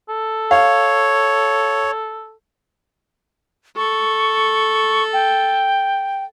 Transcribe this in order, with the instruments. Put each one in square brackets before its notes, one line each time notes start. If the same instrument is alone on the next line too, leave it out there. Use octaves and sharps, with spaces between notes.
[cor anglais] A4
[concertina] C#5 [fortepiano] F5
[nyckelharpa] A4 [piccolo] C#6
[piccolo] G5